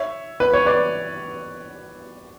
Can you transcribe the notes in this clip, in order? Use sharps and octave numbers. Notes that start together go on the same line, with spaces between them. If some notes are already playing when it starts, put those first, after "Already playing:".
Already playing: C#5 E5
B4
C#5
B4 D5